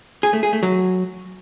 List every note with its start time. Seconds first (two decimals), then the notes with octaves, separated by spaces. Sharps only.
0.23 G#4
0.33 A3
0.43 G#4
0.53 A3
0.63 F#3